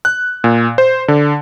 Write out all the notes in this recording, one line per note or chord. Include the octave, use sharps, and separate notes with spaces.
F#6
A#2
C5
D3